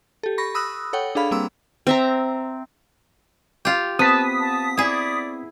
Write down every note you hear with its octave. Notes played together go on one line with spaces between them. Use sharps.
G4 A4
B5 C#6 A#6
B5 D#6 E6 F#6
A4 C#5 F#5 G5
D4 G#4 A4 F5 B5
G3 A#3 C4 D6 E6
C4 E5 A#5
F4 G4
B3 C4 A5 D#6 B6
A5
E4 G#4 D5